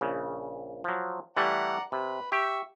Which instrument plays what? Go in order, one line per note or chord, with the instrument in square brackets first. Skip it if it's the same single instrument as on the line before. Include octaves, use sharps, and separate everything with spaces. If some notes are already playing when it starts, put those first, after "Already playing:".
[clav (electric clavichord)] A#1 C#3
F3 F#3
[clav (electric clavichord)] E3 G3 A3 [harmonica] D5 F#5 A#5
[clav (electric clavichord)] C3 [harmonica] B4
[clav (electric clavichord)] G4 [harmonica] E5 C#6